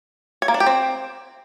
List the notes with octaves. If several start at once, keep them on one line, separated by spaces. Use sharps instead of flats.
C#5
A#3
D4
G4
C4